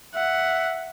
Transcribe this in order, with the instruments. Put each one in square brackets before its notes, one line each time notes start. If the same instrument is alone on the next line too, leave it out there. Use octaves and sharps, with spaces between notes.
[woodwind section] E5 [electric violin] F#5